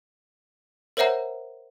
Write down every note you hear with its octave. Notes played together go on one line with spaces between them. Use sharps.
A#4 C5 C#5 E5 F#5 A#5